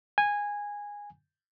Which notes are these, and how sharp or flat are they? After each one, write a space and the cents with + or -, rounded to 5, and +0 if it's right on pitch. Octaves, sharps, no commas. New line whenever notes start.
G#5 -15